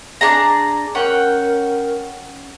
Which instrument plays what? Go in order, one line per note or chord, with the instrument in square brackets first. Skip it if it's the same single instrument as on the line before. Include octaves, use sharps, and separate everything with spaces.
[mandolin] D4 G#4 A#5
[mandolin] C#4 F#5 G5 [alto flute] A#4